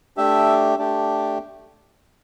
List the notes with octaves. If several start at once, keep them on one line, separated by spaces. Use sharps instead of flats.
A3 D4 G4 E5
A3 D4 G4